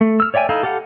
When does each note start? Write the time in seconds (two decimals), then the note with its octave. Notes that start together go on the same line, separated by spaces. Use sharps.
0.01 A3
0.20 E6 F6
0.34 C#5 D5 E5 G5 G#5
0.49 D#4 E4 A4 F5
0.63 G4 A4 F5 F#5